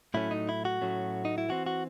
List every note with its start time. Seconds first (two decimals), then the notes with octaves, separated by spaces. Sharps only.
0.14 A2 F#3 A3 C#4 E4
0.31 D#4
0.49 E4
0.65 F#4
0.82 A2 F#3 A3 C#4
1.25 D#4
1.38 E4
1.49 E3 C4 F#4
1.66 F#4